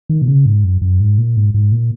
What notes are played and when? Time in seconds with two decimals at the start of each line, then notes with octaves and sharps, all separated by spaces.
0.09 D#3
0.22 B2
0.27 C#3
0.46 G#2
0.64 F#2
0.81 F#2
1.00 G#2
1.18 A#2
1.37 G#2
1.54 G#2
1.72 A#2